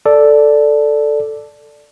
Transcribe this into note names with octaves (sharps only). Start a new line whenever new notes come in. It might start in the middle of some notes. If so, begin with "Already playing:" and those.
A4 D5